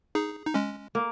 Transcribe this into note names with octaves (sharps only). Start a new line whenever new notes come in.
D#4 G#4
D#4
G#3 C#4
A#3